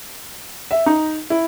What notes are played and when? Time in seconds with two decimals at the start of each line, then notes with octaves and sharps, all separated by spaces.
0.71 E5
0.86 D#4
1.30 E4